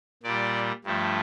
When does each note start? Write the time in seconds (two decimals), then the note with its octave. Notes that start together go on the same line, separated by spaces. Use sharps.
0.23 A#2 G3 D5
0.84 G2 F3 A3